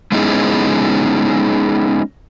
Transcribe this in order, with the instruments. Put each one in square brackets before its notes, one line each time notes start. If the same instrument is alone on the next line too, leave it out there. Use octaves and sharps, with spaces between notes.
[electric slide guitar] G#3 B3 C#4 D#4 E4 G#4